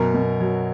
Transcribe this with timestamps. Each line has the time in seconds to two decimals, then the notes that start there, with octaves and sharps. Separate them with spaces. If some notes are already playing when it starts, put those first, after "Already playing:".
Already playing: F#2 B2 A#4 A#5
0.14 B2
0.40 F#3